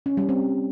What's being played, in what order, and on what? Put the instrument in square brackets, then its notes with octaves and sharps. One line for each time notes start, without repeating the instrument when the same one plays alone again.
[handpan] C#4
G3
C4